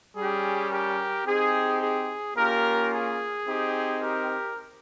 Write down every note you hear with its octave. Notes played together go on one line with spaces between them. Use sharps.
G3 C#4 G4 G#4
G4 A#4
C4 D#4 G4 G#4
G#4
A#3 C#4 F4 G4 A#4
G#4
C4 D#4 G4
G4 A#4